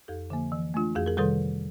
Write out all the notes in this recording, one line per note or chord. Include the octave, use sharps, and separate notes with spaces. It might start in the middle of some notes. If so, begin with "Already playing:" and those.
F2 G4 A4
D3 F3 A#3
E3
A3 D4 F4
F2 F#4 G#4
G#4 A#4
C3 D#3 G3 A4 B4